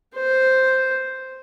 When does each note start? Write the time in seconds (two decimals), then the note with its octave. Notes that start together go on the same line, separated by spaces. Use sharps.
0.15 C5